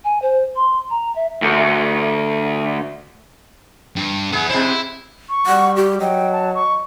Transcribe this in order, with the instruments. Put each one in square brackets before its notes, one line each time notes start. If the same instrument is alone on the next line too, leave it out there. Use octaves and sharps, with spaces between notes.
[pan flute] G#5
C5
C6
A#5
E5
[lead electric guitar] D2
[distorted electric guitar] G2
[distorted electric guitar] B3 E4 [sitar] G#4
[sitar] B2 G#3 C5 [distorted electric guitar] E4
[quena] C#6
[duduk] G3 [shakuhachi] F#5
[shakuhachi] G4
[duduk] F#3 [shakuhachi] D#5 [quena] G5
[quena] A5
C#6